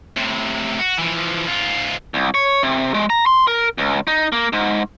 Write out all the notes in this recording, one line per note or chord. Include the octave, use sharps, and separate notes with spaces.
A2 C3
F#4
E3 F3
G#2 F4
C2
C#5
C3
G#3
A#5
C6
A#4
C#2
D#4
A#3
G#2